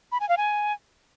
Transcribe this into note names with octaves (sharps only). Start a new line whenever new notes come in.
B5
G#5
F5
G#5